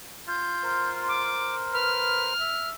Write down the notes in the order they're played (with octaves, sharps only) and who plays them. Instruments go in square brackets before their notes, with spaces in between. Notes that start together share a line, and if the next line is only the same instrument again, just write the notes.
[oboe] F4 [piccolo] G6
[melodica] A#4 C5
[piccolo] D6
[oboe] B4 [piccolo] F6
[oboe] E5